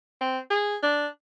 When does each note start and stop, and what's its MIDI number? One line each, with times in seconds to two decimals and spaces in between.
0.21 0.39 60
0.50 0.76 68
0.83 1.07 62